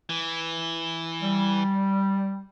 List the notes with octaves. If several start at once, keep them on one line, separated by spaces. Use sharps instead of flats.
E3
G3